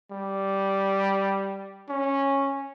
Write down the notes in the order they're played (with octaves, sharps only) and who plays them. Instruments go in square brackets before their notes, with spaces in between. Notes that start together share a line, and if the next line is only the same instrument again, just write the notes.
[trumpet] G3
C#4